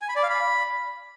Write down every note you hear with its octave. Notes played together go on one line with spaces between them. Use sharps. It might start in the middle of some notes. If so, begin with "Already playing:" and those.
G#5
B5
D5
F5
B5